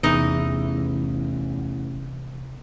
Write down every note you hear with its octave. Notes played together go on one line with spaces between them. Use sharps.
A1 E2 C3 E3 D#4 D#5